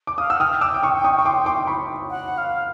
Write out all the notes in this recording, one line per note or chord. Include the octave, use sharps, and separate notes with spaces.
D6
F5 D#6
F#5 E6
G5 D#6 F6
D6 E6
D6
C#6 D#6
C#6 D#6
C#6
C6 D6
C6 D6
B5 C#6
F#5
F5